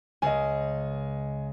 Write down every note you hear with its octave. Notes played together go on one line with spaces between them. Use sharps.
C#2 D#5 G#5